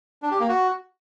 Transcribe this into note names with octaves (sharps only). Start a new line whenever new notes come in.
D4
G4
A#3
F#4